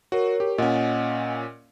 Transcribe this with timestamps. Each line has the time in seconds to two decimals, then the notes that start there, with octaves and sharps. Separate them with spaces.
0.12 F#4 A#4 C#5
0.40 G4
0.58 A#2 C#4 D#5 F#5